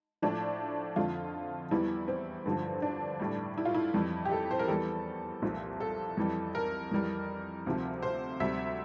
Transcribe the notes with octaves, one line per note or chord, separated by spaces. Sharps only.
A2 F3 D4
F2 D3 F3 F4
E2 E3 G3 E4
C4
G2 D3 F3
D4
A2 G3
E4
F4
E4
F2 E3 G3
G4
A4
C5
A#4
E2 E3 G3 A4
C2 A#2 F3
A4
F2 E3 G3
A#4
F2 E3 G3
D2 C3 F3
C5
D2 C3 G3 E5